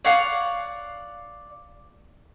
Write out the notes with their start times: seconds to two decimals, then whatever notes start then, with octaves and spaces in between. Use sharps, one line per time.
0.05 C#5 D5 F5 F#5